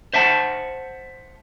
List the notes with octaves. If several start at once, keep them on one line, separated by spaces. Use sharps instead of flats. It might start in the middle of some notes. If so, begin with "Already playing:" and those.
C5 E5 F#5 A5